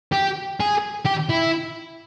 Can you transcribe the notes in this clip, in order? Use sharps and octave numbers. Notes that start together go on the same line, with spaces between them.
G4
G#4
G4
E4